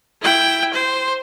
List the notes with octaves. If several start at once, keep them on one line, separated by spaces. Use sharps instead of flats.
E4 G5
C5